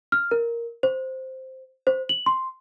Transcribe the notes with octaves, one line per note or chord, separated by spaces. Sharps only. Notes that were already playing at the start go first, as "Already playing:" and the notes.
F6
A#4
C5
C5
F#7
C6